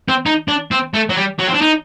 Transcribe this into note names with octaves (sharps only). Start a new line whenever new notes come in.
C4
D#4
D4
C4
A3
F#3
G3
F#3
C4
D4
D#4